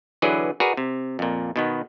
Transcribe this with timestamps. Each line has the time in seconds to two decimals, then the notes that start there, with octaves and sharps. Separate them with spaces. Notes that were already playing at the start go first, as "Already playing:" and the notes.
0.22 D3 E3 F#3 G#4 B4 D5
0.60 F#4 G#4 A#4 B4 D5
0.77 C3
1.19 F2 A#2
1.56 B2 D#3 B3